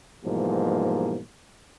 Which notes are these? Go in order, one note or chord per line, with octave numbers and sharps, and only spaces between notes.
G#2 B2 E3 F3 G3 A#3